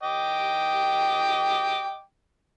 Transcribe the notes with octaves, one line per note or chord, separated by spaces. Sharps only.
D#5 G5 D6